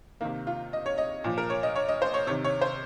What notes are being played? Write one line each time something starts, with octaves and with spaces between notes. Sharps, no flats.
C3 D#3 A#3
F4
D#5
C#5
D#5
A#2 F3
A#4
C#5
D#5
C#5
D#5
C5
C#5
C3 D#3 C#5
C#5
C5